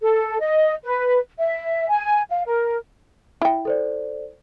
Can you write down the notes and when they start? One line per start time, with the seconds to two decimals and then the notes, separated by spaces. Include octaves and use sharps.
0.02 A4
0.41 D#5
0.84 B4
1.39 E5
1.90 G#5
2.30 F5
2.46 A#4
3.42 E4 G5
3.65 A4 C5 D5